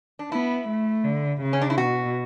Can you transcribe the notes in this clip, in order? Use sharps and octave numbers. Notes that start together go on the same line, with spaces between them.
D4
B3 E4
A3
D3
C#3
C#4
D4
E4
B2 F#4